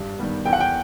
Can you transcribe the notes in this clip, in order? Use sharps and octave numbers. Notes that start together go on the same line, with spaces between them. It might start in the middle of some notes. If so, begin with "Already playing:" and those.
Already playing: G2
D#3 G3 B3
E2 G5
F#5
G5